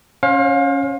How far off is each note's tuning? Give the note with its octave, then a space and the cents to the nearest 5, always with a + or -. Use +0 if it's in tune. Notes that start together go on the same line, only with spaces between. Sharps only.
C#4 +0 C5 +40 F5 +30